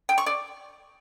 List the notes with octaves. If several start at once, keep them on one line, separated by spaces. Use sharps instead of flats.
G5
C#6
D5